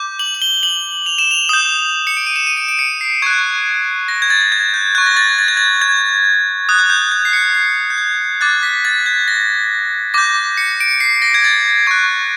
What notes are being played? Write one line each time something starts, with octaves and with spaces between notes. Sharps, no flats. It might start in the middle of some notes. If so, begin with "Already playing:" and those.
Already playing: D6 G6
F#7
F#7
G7
F#7
F7
E7
F7
D#6 G6
C#7
D7
D#7
E7
D#7
D7
D7
C#7
C7
C#6 F#6 G#6
A#6
G#6
A6
A6
G#6
G6
C#6 F#6 G#6
A#6
A6
A6
G#6
A6
G#6
D#6 F#6
G#6
G6
G#6
C7
C#7
C7
G6
G#6
D6 F#6 A6
B6
A6
G#6
A#6
D6 G6 A#6
C#7
D7
C#7
C7
A#6
G#6
A6
C#6 F#6 G#6